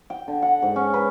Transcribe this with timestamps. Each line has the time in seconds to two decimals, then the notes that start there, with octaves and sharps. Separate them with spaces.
0.10 G5
0.28 D3
0.42 F#5
0.62 G#2
0.76 C#4
0.94 B4